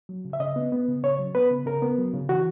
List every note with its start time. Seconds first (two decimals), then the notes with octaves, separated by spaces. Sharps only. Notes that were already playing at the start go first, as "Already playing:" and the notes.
0.09 F#3
0.25 C#3
0.33 E5
0.40 C#3 D#5
0.56 B3
0.72 B3
0.88 C#3
1.04 C#3 C#5
1.19 F#3
1.35 B3 B4
1.51 C#3
1.66 C#3 A#4
1.82 B3
1.98 F#3
2.13 C#3
2.29 E3 F#4